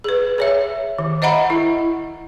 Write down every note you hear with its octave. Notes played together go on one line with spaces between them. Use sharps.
G#4 B4
G#4 C#5 E5
D#3
C5 D#5 E5 F#5 A#5 B5
E4